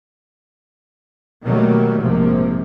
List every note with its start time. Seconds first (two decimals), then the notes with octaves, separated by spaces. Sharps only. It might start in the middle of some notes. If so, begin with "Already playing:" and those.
1.44 B2 D#3 F#3 G3 A3 A#3
2.01 A#1 G#2 C3 F3 A#3